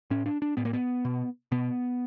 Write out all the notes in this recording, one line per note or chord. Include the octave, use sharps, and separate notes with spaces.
A2 C#4
D4
D4
A2 B3
A#3
B3
B2
B2 B3